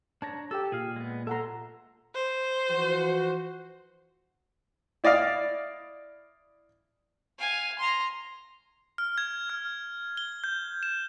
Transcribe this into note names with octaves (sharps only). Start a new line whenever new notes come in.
D4 C#5 A5 A#5
G4 A4 G5 E6
A#2 G#4 F5
G#3 B3
A4 E5 F#5 A#5 C6
C5
E3 F3 F#4
E4 D5 D#5 F5
F5 G#5
A#5 C6
F6
G#6
F6
G7
G6
E7